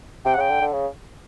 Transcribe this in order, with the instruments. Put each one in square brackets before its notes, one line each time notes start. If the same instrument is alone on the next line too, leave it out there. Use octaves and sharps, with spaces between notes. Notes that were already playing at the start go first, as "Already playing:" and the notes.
[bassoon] C3 [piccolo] G5
[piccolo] F#5
[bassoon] C#3 [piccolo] G5
[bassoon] D3
D3
C#3